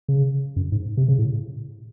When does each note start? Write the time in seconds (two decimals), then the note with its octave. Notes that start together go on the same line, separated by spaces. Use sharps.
0.08 C#3
0.56 F#2
0.72 G#2
0.97 C3
1.08 C#3
1.18 A2